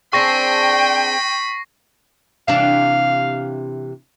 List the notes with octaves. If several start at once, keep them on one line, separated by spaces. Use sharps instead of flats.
C4 D4 G#4 G5 B5 C#6 A#6 C7
C3 E3 D4 F5